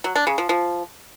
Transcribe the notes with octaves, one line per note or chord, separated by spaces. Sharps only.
F#3
D4
C#3
F3
F3